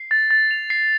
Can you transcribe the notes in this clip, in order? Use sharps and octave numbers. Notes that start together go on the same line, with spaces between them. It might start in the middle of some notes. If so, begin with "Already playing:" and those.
Already playing: C7
A6
A6
F7
C7